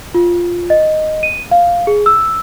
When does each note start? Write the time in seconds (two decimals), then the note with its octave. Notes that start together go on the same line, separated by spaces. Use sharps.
0.14 F4
0.70 D#5
1.23 D#7
1.51 F5
1.87 G#4
2.06 E6